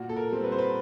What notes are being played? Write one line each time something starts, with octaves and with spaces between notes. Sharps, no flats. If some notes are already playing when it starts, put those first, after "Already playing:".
Already playing: A#2 F#4
A4
A#4
G3 C4
B4
C5
B4